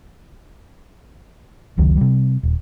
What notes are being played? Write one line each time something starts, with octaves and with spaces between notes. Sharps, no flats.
F1 C#2 D#3 F#3
C3 G3
D#1